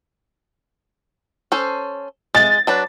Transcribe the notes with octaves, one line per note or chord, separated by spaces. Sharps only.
C#4 A4 C5
G#3 A6
F#3 D4 B4